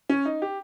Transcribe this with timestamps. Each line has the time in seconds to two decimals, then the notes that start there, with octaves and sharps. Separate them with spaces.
0.09 C#4
0.25 D#4
0.42 G4